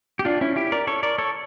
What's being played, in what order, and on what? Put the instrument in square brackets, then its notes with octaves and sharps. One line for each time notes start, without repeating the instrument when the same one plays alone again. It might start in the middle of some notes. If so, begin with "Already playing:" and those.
[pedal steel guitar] G4
D4 F4
C#4 E4
E4 G4
A#4 D5
A4 C#5
A#4 D5
A4 C#5